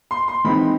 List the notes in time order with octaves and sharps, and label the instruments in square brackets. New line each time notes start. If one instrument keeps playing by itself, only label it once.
[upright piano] C6
C6
E3 G#3 C4 D#4 B5